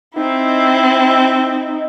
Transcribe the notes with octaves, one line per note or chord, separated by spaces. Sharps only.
C4 D#4 E4